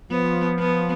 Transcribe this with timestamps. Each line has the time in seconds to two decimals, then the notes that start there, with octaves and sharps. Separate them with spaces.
0.11 F3 B3
0.59 B3